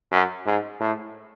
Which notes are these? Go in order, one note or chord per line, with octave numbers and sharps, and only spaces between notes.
F#2
G#2
A2